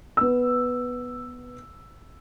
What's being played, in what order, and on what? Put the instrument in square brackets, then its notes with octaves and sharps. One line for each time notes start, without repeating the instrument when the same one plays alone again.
[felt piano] B3 E6